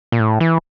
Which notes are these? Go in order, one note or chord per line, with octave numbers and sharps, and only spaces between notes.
A#2
A2
E3